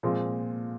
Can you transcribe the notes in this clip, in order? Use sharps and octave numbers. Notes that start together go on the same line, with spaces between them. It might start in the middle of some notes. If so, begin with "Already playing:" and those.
A#2 F3 G#3 C4 F4